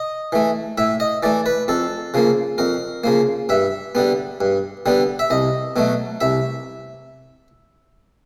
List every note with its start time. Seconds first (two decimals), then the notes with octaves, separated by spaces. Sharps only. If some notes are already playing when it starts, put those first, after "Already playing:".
Already playing: D#5
0.32 E3 A3
0.78 A2 E5
1.00 D#5
1.23 E3 A3 D5
1.46 B4
1.68 F2 A4
2.14 C#3 F3 A#3
2.58 F2 A#4
3.04 C#3 F3 A#3
3.49 G2 E5
3.95 D3 G3 B3
4.41 G2
4.86 D3 G3 B3
5.19 E5
5.30 C2 D#5
5.76 B2 F#3 A3
6.21 C2 E5